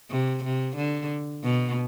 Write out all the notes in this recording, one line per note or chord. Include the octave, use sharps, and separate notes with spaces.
C3
C3
D3
B2